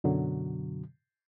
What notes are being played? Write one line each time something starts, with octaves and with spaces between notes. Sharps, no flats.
F#2 B2 D3 F#3